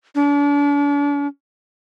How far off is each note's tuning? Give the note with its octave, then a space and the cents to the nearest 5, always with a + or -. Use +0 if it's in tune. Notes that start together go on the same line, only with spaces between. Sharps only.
D4 -40